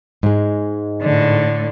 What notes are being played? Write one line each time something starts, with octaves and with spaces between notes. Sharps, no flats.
G#2 G#3
A2 D3